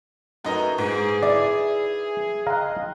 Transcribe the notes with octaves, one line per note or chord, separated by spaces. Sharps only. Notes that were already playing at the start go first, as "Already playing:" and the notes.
F#2 A3 D#4 A#4 B4 D#5 A#5
G#2 G#4
E4 D5
D#5 F5 G5 A#5 C6 F#6